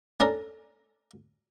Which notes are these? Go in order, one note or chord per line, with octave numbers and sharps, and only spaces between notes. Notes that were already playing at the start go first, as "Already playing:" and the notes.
C#4 D4 A4 A#4